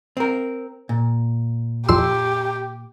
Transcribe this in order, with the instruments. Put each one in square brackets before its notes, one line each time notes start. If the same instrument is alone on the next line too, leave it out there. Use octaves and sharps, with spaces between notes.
[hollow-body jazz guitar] C4 A#4
A#2
[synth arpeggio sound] F2 C6 E6 [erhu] G4